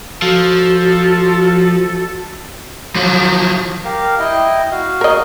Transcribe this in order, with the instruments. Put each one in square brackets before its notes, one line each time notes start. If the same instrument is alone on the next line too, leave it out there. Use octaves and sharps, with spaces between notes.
[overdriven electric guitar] F3 [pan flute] F#4 [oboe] A4
[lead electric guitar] F3 F#3
[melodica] G4 A#4 F5
E4 D#5 G5
F#4 F5
[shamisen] A#4 D#5